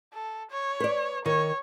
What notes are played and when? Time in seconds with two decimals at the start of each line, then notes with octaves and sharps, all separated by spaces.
0.13 A4
0.51 C#5
0.80 B4 D5
1.26 D#3 C#5